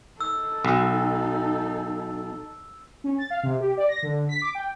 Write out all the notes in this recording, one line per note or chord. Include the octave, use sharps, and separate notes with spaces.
D#4 A4 E6
B1
C#4
A6
F5
C3
G4
D5
A#6
D3
B6
D6
G5